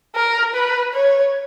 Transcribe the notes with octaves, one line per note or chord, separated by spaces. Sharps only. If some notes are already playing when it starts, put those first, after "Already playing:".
A#4
B4
C#5